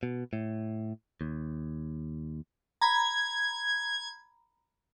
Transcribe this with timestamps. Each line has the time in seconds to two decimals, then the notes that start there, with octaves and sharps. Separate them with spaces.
0.03 B2
0.33 A2
1.21 D#2
2.81 A#5 B5 G#6